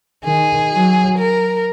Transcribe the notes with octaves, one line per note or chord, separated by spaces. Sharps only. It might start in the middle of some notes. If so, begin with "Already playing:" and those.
D#3 G#4
F#3
A#4